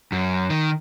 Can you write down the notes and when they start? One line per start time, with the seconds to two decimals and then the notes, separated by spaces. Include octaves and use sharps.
0.12 F#2
0.50 D#3